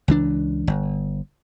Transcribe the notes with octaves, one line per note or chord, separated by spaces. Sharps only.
C#2 E3 D4
G1